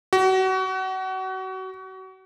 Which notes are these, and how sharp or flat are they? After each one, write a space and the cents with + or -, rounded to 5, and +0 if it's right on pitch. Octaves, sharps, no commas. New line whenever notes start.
F#4 +30